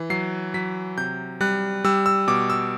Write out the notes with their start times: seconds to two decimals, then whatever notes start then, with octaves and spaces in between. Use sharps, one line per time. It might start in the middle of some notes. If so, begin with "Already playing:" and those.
Already playing: E3
0.10 F#3 C7
0.54 F#3 B6
0.97 C3 G6
1.41 G3 F#6
1.84 G3 E6
2.06 E6
2.27 B2 D6
2.50 E6